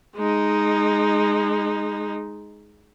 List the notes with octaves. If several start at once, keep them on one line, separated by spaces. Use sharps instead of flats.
G#3 D#4